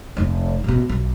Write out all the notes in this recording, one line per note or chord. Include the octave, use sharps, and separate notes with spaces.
F1 D#4
A1 B2
B1